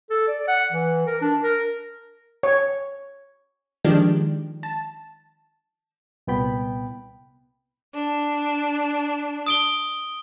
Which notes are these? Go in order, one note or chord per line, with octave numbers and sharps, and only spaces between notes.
A4
D5
F#5
E3
A#4
D4
A#4
C#5
D#3 F3 G#3 D4 G4
A5
C2 A#2 B3 G5 B5
D4
D#6 D7 G7